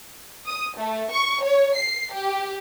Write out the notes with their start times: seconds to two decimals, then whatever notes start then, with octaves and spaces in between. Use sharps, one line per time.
0.47 D#6
0.78 A3
1.11 C#6
1.42 C#5
1.76 C7
2.13 G4